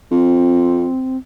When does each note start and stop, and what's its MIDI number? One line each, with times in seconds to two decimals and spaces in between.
0.11 0.86 41
0.11 1.17 60